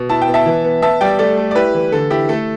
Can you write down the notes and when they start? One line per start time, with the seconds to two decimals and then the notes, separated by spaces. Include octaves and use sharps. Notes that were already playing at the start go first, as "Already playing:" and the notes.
Already playing: B2
0.09 E4 A5
0.22 G5
0.28 B3
0.34 E5 A5
0.46 E3
0.64 B3
0.82 B3 E5 A5
1.01 G3 D5 G5
1.19 A3 A4 D5
1.37 A3
1.51 D5
1.55 E4 G4 B4
1.74 E3
1.92 D3 A4
2.10 E4 G4
2.29 A3 A4